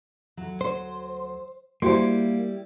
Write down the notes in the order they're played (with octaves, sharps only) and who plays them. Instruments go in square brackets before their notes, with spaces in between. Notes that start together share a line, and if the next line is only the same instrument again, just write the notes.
[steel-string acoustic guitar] D2 F#3
[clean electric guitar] C5
[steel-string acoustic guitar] G3 E4 G4 [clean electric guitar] A#3 [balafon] F#4 C5